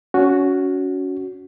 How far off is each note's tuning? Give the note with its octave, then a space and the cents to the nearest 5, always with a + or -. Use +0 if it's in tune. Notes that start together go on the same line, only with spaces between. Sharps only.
C#4 +20 F#4 +0